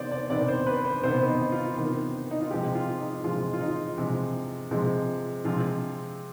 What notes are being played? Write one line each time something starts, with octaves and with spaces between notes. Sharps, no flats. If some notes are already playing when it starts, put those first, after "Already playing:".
Already playing: C3 D#3 B3 C5 D5
D5
C3 D#3 B3 D5
C5
B4
C5
C3 D#3 B3 C5
D#4
F4
C3 D#3 B3
D#4
F4
C3 F3 G#3 G4
F4
D#4
C3 F3 G#3 F4
F4
D#4
C3 F3 G#3
C3 F3 G#3
C3 F3 G#3 C4 F4